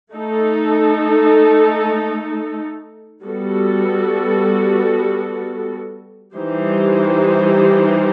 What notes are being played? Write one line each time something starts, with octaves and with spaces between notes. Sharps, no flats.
A3 D#4 A4
G3 B3 F#4 A4
E3 G3 D#4 G4 C5